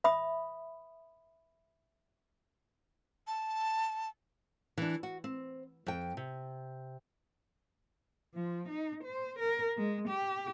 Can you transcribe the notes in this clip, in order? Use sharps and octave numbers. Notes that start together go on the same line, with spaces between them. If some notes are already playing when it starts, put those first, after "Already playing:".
E5 B5 D#6
A5
E3 D4
F#4
C4
F2 G5
C3
F3
D#4
C5
A#4
G#3
G4